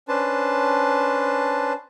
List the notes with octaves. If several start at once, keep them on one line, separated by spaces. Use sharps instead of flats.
C#4 D4 B4 C5 A5